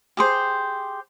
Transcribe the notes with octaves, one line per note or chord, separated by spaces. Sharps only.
G4 G#4 C5